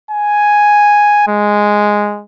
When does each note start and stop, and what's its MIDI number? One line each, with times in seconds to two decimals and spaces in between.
0.11 1.26 80
1.28 2.23 56